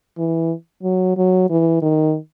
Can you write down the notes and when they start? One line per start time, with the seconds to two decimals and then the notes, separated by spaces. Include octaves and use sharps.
0.18 E3
0.83 F#3
1.17 F#3
1.50 E3
1.82 D#3